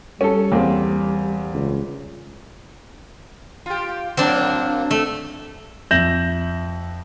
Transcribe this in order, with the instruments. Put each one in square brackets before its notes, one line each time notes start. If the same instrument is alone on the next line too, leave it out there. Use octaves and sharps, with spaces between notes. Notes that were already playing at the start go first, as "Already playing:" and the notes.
[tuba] G3 [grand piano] C#4 A4
[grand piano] E2 A#3 C4
[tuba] C#2
[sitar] F4 G4
[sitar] A2 F#3 A#3 [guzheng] C4 D4
[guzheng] A3
[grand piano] F2 E5 G6 A#6 E7 F#7